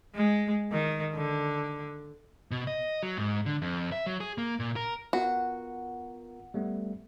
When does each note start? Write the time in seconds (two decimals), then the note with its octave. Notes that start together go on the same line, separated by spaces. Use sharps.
0.15 G#3
0.72 D#3
1.15 D3
2.51 B2
2.67 D#5
3.03 F#3
3.17 G#2
3.46 D3
3.62 F2
3.92 E5
4.06 F#3
4.20 G#4
4.38 A#3
4.60 A#2
4.76 A#4
5.13 B3 F4 F#4 A#4 F#5
6.54 G3 A3 B3